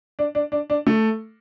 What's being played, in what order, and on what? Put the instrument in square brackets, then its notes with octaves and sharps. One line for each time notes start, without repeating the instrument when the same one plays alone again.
[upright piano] D4
D4
D4
D4
A3